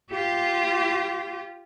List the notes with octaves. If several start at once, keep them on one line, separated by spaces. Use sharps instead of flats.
F4 G4